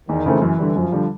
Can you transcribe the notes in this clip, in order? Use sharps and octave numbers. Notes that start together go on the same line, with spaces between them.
E2 D#3
C#3 E3 A3 C4
F#2 E3
D3 G3
F#2 F3
D3 G3